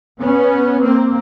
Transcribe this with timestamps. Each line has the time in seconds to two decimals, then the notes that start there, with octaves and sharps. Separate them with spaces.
0.20 B3 C#4
0.82 A#3 C4